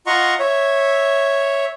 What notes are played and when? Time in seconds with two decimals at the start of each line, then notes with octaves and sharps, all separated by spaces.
0.07 F4 D#5 F#5 A#5 C6 C#6
0.39 C#5 E5